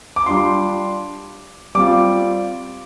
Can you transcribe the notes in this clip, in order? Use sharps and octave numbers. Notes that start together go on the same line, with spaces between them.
D6
G3 D4 F4 C6
G3 C4 F4 D6